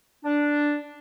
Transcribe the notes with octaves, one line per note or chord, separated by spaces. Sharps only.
D4